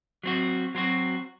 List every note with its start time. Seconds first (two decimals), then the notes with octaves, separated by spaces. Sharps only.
0.23 F#3 C4 F#4
0.75 F#3 C4 F#4